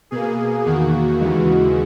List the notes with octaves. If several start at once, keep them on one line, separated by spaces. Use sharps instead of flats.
B2 A#3 G#4
E2 D#3 A#3 F#4
D#2 C#3 E3 G#3